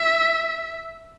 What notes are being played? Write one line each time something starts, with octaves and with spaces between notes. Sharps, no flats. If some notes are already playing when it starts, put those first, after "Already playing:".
Already playing: E5